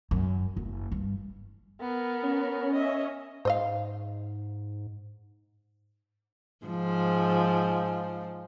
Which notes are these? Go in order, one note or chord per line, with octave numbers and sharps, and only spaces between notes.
F#2
F#1
G2
B3 A#4
C#4
D#5 E5
G#2 C5 D#5 F5
G#2 F3